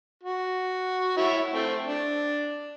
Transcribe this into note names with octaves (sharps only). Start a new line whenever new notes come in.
F#4
E4 C#5
A3 C4
D4